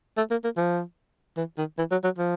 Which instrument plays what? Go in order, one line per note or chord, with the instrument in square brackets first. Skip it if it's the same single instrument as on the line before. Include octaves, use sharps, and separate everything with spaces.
[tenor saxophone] A3
A#3
A#3
F3
E3
D#3
E3
F#3
F#3
F3